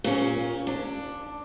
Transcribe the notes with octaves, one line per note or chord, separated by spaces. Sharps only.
A#2 C#4
D4